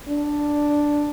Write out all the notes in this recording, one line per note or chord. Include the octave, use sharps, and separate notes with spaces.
D4